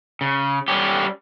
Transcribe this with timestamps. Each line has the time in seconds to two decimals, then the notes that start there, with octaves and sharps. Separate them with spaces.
0.21 C#3
0.68 G3 C#4 G4